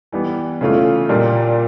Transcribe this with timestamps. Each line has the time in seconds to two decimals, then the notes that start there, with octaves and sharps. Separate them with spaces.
0.12 E3 G3 B3
0.61 C#3 E3 A3 C#4 F4
1.09 A#2 G3 A#3 D4 F4